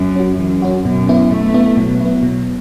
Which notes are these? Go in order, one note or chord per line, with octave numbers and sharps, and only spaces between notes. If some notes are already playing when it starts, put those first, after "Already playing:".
Already playing: F#2
C#4 F#4
F#2 E3
C#4 F#4
F#2 B2
B3 E4
B2 A3
B3 E4
B2 F#3
B3 E4
B2